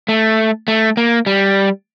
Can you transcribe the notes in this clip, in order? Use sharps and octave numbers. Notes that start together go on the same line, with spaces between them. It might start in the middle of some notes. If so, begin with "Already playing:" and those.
A3
A3
A#3
G3